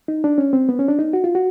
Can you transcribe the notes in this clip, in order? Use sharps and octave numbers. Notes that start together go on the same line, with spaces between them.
D#4
D4
C#4
C4
B3
C#4
D4
D#4
F#4
F4
F#4